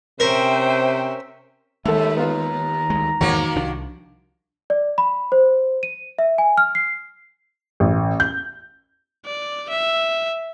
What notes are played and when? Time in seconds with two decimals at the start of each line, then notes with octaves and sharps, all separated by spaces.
0.20 C3 C#4 A#4 C5 E5 G5
1.85 D#2 G#3 A3 A4 E5
2.17 B3 F4 A#5
2.90 D2 G#3
3.21 E2 G#2 B2 D#3 A#3 F#4 C#5
3.56 C2 F3 D4
4.70 D5
4.98 B5
5.32 C5
5.83 D#7
6.19 E5
6.38 G#5
6.58 F6
6.75 C7
7.80 A1
8.20 G6
9.26 D5
9.70 E5